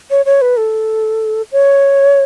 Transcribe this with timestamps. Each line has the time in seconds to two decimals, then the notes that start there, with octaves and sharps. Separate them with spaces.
0.11 C#5
0.26 C#5
0.42 B4
0.57 A4
1.52 C#5